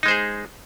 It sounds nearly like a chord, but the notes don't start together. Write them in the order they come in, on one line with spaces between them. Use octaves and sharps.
D#4 G#3 C5 G#4